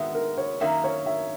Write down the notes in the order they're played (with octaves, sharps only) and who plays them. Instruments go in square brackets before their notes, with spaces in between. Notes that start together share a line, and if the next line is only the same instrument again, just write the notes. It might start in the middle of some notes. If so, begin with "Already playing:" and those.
Already playing: [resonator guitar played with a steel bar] D#3 G#3 B3 [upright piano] E5 F#5
[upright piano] A#4
C#5
[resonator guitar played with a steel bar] F#2 D#3 A#3 C#4 [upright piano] E5
[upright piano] C#5
E5